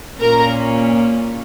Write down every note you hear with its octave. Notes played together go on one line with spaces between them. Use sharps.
A#2 A#3 C#4 A#4 A#5